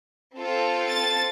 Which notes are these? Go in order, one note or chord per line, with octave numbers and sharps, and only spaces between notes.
C4 F4 A4
A6